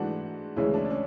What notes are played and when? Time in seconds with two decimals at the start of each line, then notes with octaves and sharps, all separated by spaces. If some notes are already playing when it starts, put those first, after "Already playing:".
Already playing: G#2 E3 A3 D4 F#4
0.56 D2 C#3 E3 G#3 C#4 E4
0.74 D4
0.85 D4
0.90 C#4